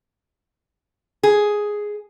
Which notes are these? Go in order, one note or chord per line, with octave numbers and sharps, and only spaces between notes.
G#4